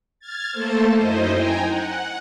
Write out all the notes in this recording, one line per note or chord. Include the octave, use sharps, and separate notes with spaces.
F6 G#6 A6
A3 A#3 A4 C5 A5
F#2 D#4 E4 C5 D#5
G5 G#5 A#5
F#5